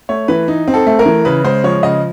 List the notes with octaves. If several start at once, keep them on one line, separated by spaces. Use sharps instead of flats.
A3 C#5
E3 B4
D#4
C4
A4
A3
A#4
E3
C#3 B4
G#3 C5
F3 C#5
C#3 D#5